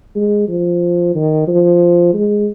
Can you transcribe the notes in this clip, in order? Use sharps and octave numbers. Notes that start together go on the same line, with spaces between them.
G#3
F3
D#3
F3
G#3